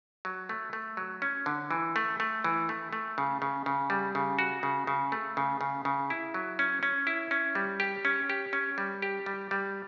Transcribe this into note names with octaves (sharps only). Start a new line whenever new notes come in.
F#3
A3
A3
F#3
C#4
D3
E3
A3
A3
E3
A3
A3
C#3
C#3
C#3
G3
C#3
F#4
C#3
C#3
A3
C#3
C#3
C#3
E4
F#3
C#4
C#4
E4
C#4
G3
G4
C#4
G4
C#4
G3
G4
G3
G3